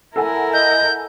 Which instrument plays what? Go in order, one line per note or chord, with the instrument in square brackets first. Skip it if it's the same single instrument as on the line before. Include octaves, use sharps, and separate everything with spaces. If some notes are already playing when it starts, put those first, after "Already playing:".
[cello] E4 A#4 [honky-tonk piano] A4 F#5 G#5
[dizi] D#5 [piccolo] G6